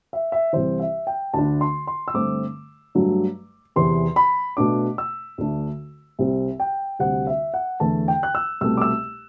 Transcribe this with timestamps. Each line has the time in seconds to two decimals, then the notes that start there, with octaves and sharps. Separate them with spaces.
0.13 E5
0.32 E5
0.53 C2 C3 E3 C5
0.80 E5
1.07 G5
1.34 D2 D3 A3 D4 A5
1.61 C6
1.87 C6
2.08 E6
2.14 G2 D3 A3 C4 D6
2.95 G2 F#3 A3 D4
3.76 E2 C3 E3 C6
4.16 B5
4.57 B2 A3 D4 D6
4.98 E6
5.38 D2 D3 A3 D4
6.19 C2 C3 G3 C4
6.60 G5
6.99 D2 C3 G3 C4 F#5
7.27 E5
7.54 F#5
7.80 E2 D3 A3 A5
8.08 G5
8.23 F#6
8.35 E6
8.61 C2 B2 A3 E6
8.77 D6
8.81 E6